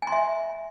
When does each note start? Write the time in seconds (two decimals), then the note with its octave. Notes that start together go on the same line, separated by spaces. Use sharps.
0.02 G#5
0.07 C6
0.12 E5